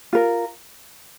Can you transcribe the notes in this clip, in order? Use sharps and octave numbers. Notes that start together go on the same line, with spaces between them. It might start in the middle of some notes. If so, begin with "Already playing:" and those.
F4 A#4